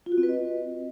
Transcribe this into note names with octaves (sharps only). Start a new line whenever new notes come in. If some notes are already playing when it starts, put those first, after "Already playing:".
F4
F#4
C4
B4
D#5